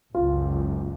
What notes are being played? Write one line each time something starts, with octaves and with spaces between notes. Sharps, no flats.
F#1 C#2 F#2 F4